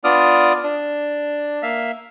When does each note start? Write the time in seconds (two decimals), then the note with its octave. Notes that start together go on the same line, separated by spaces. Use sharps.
0.04 B3 D4 F4 D5 D#6 F6
0.63 D4
1.62 A#3 E5 F5